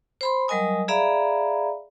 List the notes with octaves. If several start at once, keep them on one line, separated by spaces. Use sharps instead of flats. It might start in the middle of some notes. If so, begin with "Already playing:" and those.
C5 B5 C6
F#3 G3 A#4 D#5 G#5 D#6
G#4 D5 E5 F5 A#5 B5